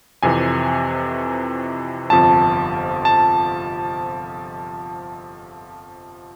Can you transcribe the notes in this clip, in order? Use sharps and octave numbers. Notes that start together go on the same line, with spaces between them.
F2 C3 E3 G#5
G1 F2 C3 F3 A5
A5